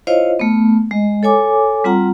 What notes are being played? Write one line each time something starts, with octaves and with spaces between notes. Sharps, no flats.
E4 F4 C5 C#5 D#5 F5
A3 B3
G#3 D#5
A4 C#5 G#5 D6
G3 C4 F4 F#5 A#5